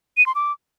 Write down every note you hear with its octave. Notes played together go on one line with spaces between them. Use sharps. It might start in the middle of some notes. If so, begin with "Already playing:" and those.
D#7
C6
D6